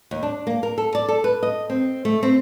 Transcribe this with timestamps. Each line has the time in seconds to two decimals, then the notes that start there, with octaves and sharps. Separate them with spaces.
0.11 D#2
0.23 D4
0.47 A#3
0.63 A#4
0.78 A4
0.95 D5
1.08 A4
1.24 B4
1.43 D#5
1.70 C4
2.05 A3
2.23 C4